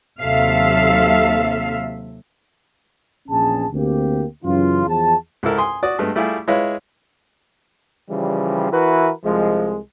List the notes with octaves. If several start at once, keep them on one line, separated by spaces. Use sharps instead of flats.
D#2 C3 F#3 A4 E5 F5
A#1 E2 C#4 G#4 A5
D2 A#3 C4 G4
F#2 C#3 E3 F4
E2 F3 G#4 A5
C#2 G#2 E4 A4 A#4
G#5 C6 D#6
F#4 D5 D#6
G2 G#3 A3 B3
G3 A3 E4 F4 G4 G#4
G#3 E4 F4 B4 C#5 F5
C#3 E3 F3 G3
E3 E4 F#4 A#4 B4
C2 F3 G#3